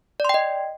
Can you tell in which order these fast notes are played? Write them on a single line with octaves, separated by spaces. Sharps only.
D5 C6 G5 D#5